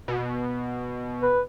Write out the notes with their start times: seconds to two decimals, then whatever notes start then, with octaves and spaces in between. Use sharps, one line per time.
0.08 B2
1.22 B4